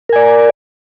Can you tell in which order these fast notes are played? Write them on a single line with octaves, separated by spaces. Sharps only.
A#4 G#5 D5